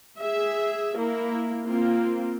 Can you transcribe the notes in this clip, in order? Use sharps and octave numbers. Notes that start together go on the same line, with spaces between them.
G#4 E5
A#3 E4
A#3 C4 F4